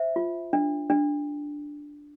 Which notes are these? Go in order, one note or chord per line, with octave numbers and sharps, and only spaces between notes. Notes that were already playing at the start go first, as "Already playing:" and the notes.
Already playing: C5 E5
F4
D4
D4